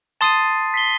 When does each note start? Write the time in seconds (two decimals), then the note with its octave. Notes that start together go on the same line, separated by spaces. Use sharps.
0.21 A5 C6 D#6 A6 C7 D#7
0.74 B6 C7 G7